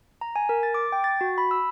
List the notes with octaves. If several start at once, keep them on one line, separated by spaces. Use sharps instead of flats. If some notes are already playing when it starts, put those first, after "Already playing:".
A#5
G#5
A#4
A6
D6
G5
A6
F#4
B5
E6